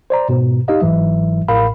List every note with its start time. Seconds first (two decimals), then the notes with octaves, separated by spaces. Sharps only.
0.10 C5 D5 A#5
0.29 G#2 B2
0.68 D#4 G4 D#5 F5
0.81 G1 G#2 E3 F#3 E5
1.48 A1 A2 A#4 F5 B5